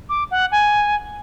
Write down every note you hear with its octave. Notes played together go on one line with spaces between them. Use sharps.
D6
F#5
G#5